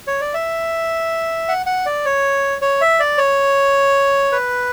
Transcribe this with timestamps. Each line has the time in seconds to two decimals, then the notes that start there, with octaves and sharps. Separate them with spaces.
0.07 C#5
0.21 D5
0.34 E5
1.48 F#5
1.66 F#5
1.86 D5
2.05 C#5
2.62 C#5
2.81 E5
3.00 D5
3.18 C#5
4.32 B4